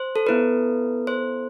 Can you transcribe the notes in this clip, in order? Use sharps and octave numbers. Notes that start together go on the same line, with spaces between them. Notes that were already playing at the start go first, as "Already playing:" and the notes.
Already playing: C5
A4
B3 E4 A4 B4
C5